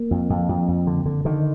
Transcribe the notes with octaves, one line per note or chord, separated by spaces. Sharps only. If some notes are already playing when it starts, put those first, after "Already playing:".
Already playing: A#3
F2
F2
F2
F2
D3
D3
D3 D#3